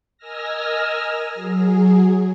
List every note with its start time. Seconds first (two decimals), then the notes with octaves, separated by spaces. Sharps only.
0.18 A#4 D#5 G#5 E6 F6 A#6
1.34 F#3 G#4